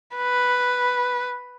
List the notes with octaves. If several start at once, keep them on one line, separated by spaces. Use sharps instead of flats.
B4